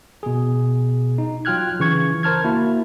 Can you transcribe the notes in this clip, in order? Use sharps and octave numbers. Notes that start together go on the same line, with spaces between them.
B2 G#4
D#4
F#3 F4 G5 F6 F#6 G#6
C#3 E3 C#6 G#6
A#4 C5 A5 F6 G#6
A#3 E4 F#4